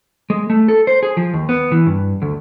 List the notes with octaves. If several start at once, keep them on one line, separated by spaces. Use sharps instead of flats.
G#3
A3
A4
C5
G#4
F3
D#2
B3
E3
G2
D2